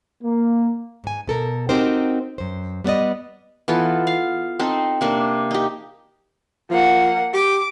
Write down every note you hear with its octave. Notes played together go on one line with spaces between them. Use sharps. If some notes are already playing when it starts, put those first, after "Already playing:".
A#3
G#2 G#5
B2 A4 A#4
C4 D#4 F#4 G4 A#4 C5
F#2 C5
G3 B3 B4 D5 D#5
E3 B3 F4 A4
F5
C4 D#4 A4
C3 A#3 D4
D#4 G4
F3 A#3 F#5
G4 D6